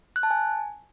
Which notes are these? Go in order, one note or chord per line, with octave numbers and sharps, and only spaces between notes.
F#6
A5
G#5